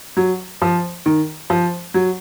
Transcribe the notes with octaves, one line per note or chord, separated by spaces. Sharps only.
F#3
F3
D#3
F3
F#3